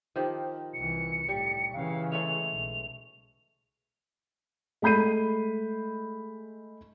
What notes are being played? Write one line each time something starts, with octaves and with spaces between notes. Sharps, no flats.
D#3 F3 G4
C2 E3 C#7
A2 G3
C#3 E3 F5
G#3 A3 C#5 F7
B1
G#3 A3 B5 G6 C7 D#7